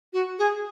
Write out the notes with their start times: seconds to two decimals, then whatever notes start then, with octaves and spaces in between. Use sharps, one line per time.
0.13 F#4
0.39 G#4